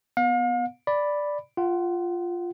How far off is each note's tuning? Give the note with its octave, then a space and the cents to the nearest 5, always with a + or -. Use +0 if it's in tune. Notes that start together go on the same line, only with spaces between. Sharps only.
B3 +0 F5 +40
D5 +0 B5 +0
F4 +0 F#5 +30